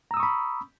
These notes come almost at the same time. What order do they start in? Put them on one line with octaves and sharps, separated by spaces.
A#5 E6 D#6 C#6 B5